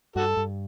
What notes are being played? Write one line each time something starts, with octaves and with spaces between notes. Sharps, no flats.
G2 F#4 A4
G2